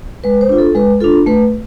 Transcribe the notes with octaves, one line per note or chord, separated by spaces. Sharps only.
G#3 B4
C5
D4 F4
A4
G#3 B4
D4 F4 A4
A3 B4